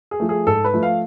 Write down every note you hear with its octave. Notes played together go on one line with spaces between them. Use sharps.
G#4
F3 A3
G#4
G#2 A4
B4
F3 A3
F5